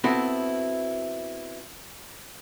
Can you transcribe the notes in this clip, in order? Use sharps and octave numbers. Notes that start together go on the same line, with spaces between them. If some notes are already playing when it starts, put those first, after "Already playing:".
B3 C4 E4 F#4 A4